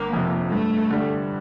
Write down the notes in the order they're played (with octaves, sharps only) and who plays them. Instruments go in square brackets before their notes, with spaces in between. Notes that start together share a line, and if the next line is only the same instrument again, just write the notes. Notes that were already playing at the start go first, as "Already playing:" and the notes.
Already playing: [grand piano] G1 [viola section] A#3
[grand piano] F2 C3 F3
[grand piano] G2 [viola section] A3
[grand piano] D3 G3